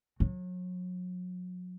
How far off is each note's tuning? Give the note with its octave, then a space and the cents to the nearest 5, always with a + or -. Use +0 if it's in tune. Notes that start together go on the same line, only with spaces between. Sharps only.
F#3 -35